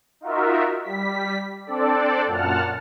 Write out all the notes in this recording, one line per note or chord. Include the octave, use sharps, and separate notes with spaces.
D#4 F4 F#4 A#4 E5
G3 B6
C4 D4 A4 D5
F#2 A#2 F#5 A5 F6